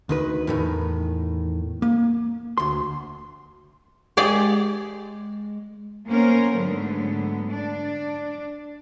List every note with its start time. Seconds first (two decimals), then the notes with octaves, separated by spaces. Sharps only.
0.09 D2 D#3 B4
0.47 E2 A2 D#3
1.82 A#3
2.58 D2 C6
4.17 G#3 G4 G#4 D5
6.07 A#3 B3 C#4 A#4 C5
6.54 G#2 D3 F#3 A3 B3
7.51 D4 D5